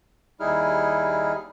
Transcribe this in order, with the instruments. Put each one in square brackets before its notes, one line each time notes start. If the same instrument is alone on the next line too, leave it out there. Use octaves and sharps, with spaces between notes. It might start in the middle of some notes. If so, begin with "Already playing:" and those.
[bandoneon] D#2 G3 D#4 E4 G#4 F6